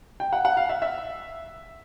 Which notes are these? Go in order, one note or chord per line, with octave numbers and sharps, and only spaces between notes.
G5
F#5
F#5
F5
E5
E5